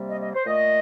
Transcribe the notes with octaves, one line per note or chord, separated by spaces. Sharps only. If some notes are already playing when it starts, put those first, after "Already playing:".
Already playing: C3 G3 A#3
D#5
D#5
C5
A#2 A3 D#5